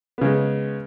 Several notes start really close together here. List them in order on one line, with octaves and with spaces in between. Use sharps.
B3 C#3 G#3